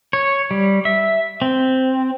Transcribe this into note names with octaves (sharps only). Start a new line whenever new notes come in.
C#5
G3
E5
C4